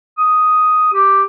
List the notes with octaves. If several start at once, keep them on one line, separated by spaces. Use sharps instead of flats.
D#6
G4